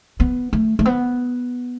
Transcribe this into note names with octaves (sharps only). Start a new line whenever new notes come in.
B3
A3
A3
B3